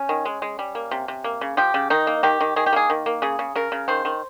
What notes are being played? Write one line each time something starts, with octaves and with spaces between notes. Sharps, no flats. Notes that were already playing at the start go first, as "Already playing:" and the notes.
Already playing: C#4
D#3
G#3
G#3
G3
A#3
C3
C3
A#3
C#3
F3 G4
C#3
D#3 D#4
A#3
D#3 G4
D#3
D#3 G#4
G4
A#3 G#4
D#3
A#3
C#3 G#4
C#3
C#3 A#4
C#3
D#3 C5
D#3